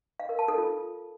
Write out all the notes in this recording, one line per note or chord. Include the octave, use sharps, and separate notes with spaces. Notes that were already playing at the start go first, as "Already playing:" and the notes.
F5
A#4
A5
A4
F4